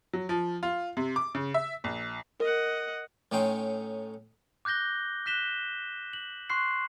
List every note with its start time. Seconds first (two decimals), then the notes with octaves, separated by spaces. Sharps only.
0.13 F#3
0.29 F3
0.63 F4
0.97 C3
1.16 D6
1.35 C#3
1.54 E5
1.84 A#1
2.40 A#4 D#5 F#5
3.32 A2 A3 C#4 D#4 G5 C6
4.65 D6 F#6 G6 A#6 G7
5.26 F#6 B6 E7 G7
6.13 F#7
6.50 C6 C#6 F#6 C7